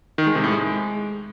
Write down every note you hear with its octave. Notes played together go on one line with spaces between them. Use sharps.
D#3
G#3
C3
A2
G#3